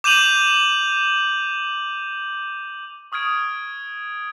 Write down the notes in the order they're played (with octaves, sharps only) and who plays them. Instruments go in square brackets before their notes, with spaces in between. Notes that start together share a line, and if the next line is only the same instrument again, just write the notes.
[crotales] D6 G6 D#7 F7 F#7
C#6 D#6 F6 G#6 D7 F7